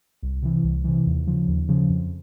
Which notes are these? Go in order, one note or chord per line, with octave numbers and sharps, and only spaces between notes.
C2
C3 E3
C2
C3 E3
D#2
C#3 F3
D#2
C#3 F3
F2